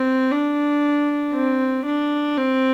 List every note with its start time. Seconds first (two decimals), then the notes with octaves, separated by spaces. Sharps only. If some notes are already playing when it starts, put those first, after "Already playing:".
Already playing: C4
0.32 D4
1.34 C4
1.86 D4
2.37 C4